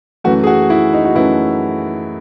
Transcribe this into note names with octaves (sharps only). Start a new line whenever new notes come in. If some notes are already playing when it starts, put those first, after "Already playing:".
F#2 E3 A3 F#4
G#4
F#4
E4
D#4
F#4
F#2 E3 A3 E4